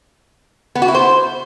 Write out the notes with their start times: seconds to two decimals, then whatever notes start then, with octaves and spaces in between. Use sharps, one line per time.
0.75 B3
0.82 F#4
0.88 E4
0.95 C5